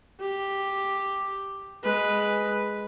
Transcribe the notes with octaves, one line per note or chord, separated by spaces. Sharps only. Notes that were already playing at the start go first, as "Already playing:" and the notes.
G4
G#3 B4